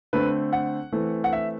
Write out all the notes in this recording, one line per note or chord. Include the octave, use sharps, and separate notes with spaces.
D3 A3 C4 B4
F#5
E3 A3 C4
F#5
E5